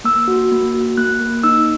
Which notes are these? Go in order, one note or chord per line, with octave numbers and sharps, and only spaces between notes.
A#3 E6
F#4
A#3
F#4
A#3 F#6
A#3
D#4 E6